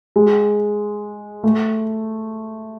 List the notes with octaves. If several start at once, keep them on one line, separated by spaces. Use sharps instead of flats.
G#3
A3